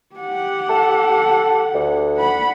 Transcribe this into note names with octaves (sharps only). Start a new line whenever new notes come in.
G4 F#5
A4
D2
F#5 B5